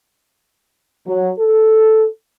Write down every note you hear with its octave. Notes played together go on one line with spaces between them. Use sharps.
F#3
A4